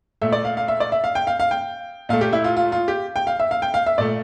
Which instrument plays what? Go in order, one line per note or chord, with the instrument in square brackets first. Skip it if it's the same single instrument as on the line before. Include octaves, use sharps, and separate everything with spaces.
[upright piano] A#2 A3 E5
D5
F5
F5
E5
D5
E5
F5
G5
F5
F5
G5
A#2 A3 F5
G4
E4
F4
F4
F4
G4
G5
F5
E5
F5
G5
F5
E5
A#2 A3 D5